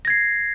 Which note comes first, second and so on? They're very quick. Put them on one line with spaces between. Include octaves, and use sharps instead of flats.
A#6 G#6 C7